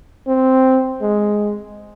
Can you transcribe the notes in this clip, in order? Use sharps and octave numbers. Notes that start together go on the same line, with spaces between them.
C4
G#3